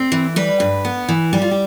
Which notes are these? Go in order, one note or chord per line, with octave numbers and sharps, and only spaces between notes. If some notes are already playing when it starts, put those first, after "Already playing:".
Already playing: C4
E3
G3 B4
G2
B3
E3
G3 G4
F4
G4